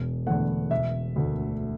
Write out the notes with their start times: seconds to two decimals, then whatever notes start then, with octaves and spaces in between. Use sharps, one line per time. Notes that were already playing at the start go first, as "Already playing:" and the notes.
Already playing: E1
0.26 E2 D3 A3 F#5
0.71 E1 E5
1.16 D2 D3 A3